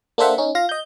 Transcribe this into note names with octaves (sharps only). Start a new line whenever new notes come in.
A#3 D4 A4 C5 E5 F#5
C#4 D#4
F4 F5 A#6
D#5 G6